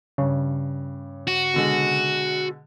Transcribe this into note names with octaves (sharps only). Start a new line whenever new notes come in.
G2 C#3
F#4
B2 D3 G#3